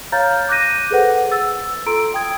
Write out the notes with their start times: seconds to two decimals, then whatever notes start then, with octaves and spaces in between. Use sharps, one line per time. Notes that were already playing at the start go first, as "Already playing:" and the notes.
0.12 C#5 F5 A#5 F6 G6 A6
0.49 D6 F#6 G6 A#6 D#7
0.91 G#4 A4 B4 C5 F#5
1.31 E6 A6
1.86 F4 A4 A#5 C6 E6 D7
2.14 G5 D#6 G#6